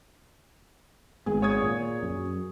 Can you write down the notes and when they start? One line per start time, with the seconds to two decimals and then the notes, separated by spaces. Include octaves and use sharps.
1.26 G#1 G#3 B3 G#4
1.42 C#5 D#6 G#6
1.60 A#2
2.03 F#2